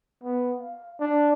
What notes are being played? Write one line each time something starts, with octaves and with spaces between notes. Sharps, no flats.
B3
F5
D4